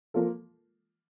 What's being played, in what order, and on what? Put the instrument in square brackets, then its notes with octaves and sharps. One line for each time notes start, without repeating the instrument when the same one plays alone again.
[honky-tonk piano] F3 A#3 F4 A4